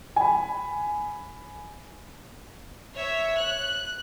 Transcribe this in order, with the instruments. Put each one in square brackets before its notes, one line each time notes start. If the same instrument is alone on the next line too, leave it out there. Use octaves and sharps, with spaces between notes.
[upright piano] G#5 B5
[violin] C#5 E5
F#6